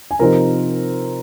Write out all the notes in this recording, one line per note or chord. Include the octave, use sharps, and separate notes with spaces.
G#5
C3 F3 C4 D#4 A#4 A#5